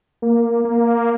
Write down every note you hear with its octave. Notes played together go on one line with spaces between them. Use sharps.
A#3
A#3